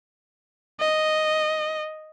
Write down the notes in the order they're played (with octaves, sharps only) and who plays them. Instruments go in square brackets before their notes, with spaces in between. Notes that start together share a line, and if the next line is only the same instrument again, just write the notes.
[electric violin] D#5